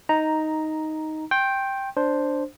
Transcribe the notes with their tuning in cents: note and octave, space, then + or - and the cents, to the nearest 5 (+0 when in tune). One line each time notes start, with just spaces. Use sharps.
D#4 +5 A#5 +0
G5 +0 C6 +35
D4 +0 C5 +0